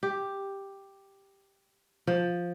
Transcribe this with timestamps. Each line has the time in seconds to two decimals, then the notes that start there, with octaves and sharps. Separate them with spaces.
0.03 G4
2.07 F3